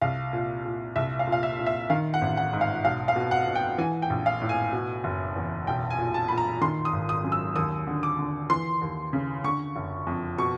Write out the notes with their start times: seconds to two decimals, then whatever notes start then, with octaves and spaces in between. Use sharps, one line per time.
0.01 C2 F5
0.33 A#2
0.65 A#2
0.96 C2 E5
1.19 F5
1.27 A#2
1.32 F5
1.43 E5
1.59 A#2
1.66 E5
1.90 D#3 F5
2.14 F#5
2.21 A1
2.37 F#5
2.53 G#2
2.61 F5
2.84 B1 F5
3.08 F5
3.16 B2
3.31 F#5
3.47 B2
3.55 G5
3.78 E3 G#5
4.02 G5
4.10 A#1
4.26 F5
4.41 A2
4.49 G#5
4.73 B2
5.04 F#1
5.36 E2
5.67 B1 G5
5.90 G#5
5.98 A#2
6.14 A5
6.28 A#2 B5
6.38 A#5
6.61 D#3 C6
6.85 D#6
6.93 G#1
7.09 D#6
7.24 F#2
7.32 E6
7.56 D#2 D#6
7.87 D3
8.03 D6
8.19 D3
8.50 E3 C6
8.81 D#2
9.13 C#3
9.44 D3 C#6
9.76 F#1
10.07 F2
10.38 B2 C#6